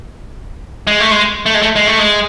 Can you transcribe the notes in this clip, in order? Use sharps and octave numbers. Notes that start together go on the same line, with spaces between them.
G#3
A3
G#3
A3
G#3
A3
G#3
A3
G#3